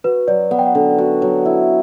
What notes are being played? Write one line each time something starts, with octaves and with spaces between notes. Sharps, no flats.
F#4 B4
F#3 D5
B3 F#5
G5
F#5
D3
F#4
F#3
E4